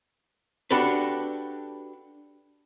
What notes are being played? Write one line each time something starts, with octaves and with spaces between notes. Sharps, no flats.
D4 F#4 G4 A4 B4